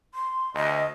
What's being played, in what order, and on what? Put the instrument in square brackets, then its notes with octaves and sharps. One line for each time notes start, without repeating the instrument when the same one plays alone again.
[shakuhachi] C6
[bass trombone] D2 [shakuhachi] D#5